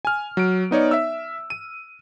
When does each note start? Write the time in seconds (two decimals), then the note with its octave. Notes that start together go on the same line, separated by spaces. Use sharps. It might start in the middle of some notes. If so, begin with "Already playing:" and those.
0.05 G#5 F6
0.37 F#3 D7
0.71 B3 D#4 C#5 D5
0.91 E5 E6
1.50 D#7